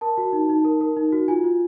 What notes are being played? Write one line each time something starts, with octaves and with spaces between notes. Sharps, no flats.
A#4 A5
F#4
D#4
D#4
A#4
A#4
D#4
F#4
F4 G#5
F4